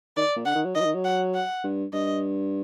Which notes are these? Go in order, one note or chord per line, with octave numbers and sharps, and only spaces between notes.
D#3 D5
A#2
D3 F#5
D#3
F#3
D#3 D#5
F#3
D#3
F#3
F#5
F#5
G2
G2 D#5